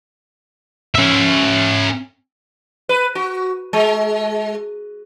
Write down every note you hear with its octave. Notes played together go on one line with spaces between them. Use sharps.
C#4 E5
B4
F#4
G#3